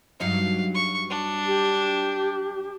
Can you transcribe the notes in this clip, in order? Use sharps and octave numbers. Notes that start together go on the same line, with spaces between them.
G2 F#3 D#4 F5
C#6
D4
G4